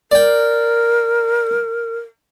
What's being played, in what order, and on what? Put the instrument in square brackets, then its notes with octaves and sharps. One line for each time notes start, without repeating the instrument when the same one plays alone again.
[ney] A#4 [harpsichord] D5 G5